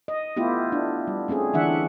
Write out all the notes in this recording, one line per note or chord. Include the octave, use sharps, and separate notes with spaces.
D#5
A3 B3 E4 F4 G4
D4
G3
A3 C4 C#4 G#4
D3 E3 D4 E5 F#5